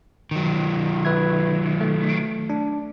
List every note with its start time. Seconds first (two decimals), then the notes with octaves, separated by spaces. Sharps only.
0.31 D#3 F#3
1.05 B4 E5 G#6
1.81 A3
2.50 D4